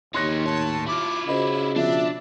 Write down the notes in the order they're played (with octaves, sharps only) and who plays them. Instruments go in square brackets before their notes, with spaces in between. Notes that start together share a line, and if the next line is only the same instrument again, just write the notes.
[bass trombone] D#2 [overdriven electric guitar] D#4 C#5 [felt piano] C6 F#6 A#6
[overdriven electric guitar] A2 C#5 [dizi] A5
[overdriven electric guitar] E4 F4 [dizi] D6
[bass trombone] C#3 [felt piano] F#4 C5 D#5 [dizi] B5
[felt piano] B2 F3 [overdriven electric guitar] D4 [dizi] E5